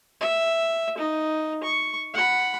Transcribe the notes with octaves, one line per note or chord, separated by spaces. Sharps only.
E5
D#4
C#6
F#5 B5